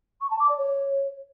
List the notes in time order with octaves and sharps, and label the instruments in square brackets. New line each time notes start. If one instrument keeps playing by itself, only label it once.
[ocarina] C#6
A5
D6
D5
C#5